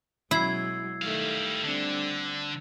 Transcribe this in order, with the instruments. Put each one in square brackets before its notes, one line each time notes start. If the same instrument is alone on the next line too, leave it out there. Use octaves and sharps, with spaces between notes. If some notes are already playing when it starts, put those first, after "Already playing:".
[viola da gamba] B2 F#3 G#3 [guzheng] E4 [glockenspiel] E6 G#6 C7
[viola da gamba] D#3 A3 [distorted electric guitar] G3 F5
[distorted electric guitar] D3 [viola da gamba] G3 C4 D4